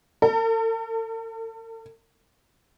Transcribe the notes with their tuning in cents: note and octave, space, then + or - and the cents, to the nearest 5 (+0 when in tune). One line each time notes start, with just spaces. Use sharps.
A4 +45